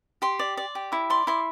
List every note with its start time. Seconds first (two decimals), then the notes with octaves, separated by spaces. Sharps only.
0.22 G4 C6
0.39 D5
0.57 D5
0.75 G4
0.92 E4 D6
1.10 D5 C6
1.27 E4 C6